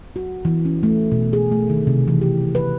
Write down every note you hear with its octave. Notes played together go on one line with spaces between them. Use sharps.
F#4
E3
C#4
A3
B2
G#4
A3
D#3
C3
E3
G4
B4